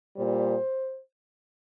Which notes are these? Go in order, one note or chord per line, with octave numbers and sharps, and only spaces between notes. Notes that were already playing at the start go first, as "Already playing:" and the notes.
A#2 G3 C5